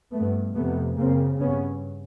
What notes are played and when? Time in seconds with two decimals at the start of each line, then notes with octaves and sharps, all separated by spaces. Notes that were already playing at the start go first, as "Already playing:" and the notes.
0.13 G2 A3 B3
0.55 F2 C3 A3 B3
0.97 F#2 C#3 A#3 C4
1.40 G2 B3 C#4